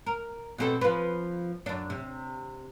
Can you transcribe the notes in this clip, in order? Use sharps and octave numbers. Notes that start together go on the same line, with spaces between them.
A#4
B2 C4 A4
F3 B4
F#2 D4
C3